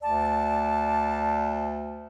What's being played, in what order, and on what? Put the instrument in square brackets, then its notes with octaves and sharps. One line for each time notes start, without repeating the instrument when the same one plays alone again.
[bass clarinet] D2 [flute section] D5 A5